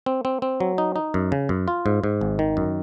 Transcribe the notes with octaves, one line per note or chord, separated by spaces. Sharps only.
C4
C4
C4
F#3
D#4
D#4
F#2
C#3
F#2
F4
G#2
G#2
G#1
D#3
F#2